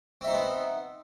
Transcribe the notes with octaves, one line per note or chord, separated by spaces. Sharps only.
B3 C4 D#4 C5 E5